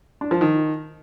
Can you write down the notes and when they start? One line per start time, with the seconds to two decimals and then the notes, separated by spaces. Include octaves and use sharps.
0.21 D4
0.31 F3
0.41 D#3